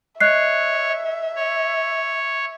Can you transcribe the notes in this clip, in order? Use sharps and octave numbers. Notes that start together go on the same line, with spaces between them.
C#5 D#5 E5 F#6 C7
C#5